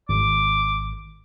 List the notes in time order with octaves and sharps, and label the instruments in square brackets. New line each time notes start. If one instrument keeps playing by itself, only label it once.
[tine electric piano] G#1 [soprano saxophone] D6